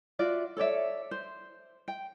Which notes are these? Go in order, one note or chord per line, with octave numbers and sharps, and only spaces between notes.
F4 F#4 D5 E5
A4 C#5 D5 E5
C5
G5